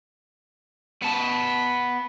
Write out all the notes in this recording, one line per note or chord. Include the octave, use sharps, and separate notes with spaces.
B3 A5